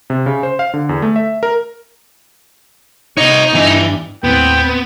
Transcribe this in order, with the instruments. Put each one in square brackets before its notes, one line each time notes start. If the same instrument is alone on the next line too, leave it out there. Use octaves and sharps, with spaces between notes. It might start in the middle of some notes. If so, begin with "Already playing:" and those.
[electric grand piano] C3
C#3
C5
F5
D3
E2
A3
E5
A#4
[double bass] C3 B3 [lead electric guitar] D#4 [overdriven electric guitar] C#5 D#5
[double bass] G2 [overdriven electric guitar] E3
[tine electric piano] D#2 A2 [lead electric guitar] B3 [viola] C4 B4 [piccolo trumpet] G5